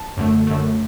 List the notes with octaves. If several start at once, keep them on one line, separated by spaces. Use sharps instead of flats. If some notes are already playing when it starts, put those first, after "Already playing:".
Already playing: A5
F#2 D3 A3
F#2 D3 A3